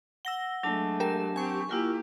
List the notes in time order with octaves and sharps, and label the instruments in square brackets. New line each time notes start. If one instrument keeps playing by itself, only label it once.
[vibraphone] F#5 [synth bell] E6 A#6 G7
[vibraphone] F#3 D4 A5 [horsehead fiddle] G#3 A3
[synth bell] G4 A#4 E7
[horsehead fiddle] C4 G4 [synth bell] G#5 C#6
[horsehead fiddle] A#3 G4 [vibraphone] E4 F4 A#4